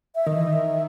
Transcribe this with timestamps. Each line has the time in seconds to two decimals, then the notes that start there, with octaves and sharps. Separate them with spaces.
0.15 E5
0.26 D#3 D#5
0.36 E3
0.47 D#3
0.53 E5